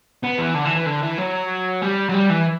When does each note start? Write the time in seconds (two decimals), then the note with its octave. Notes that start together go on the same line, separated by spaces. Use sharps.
0.23 B3
0.38 E3
0.54 D3
0.65 E3
0.76 E3
0.86 D3
1.02 E3
1.18 F#3
1.82 G3
2.09 F#3
2.14 G3
2.30 E3